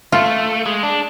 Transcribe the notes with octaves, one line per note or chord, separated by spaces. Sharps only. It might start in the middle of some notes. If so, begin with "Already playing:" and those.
A3 F4
G#3
D4